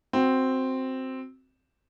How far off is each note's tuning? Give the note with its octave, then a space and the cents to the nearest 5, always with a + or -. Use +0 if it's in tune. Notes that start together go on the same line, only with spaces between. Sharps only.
C4 +0 F#4 +0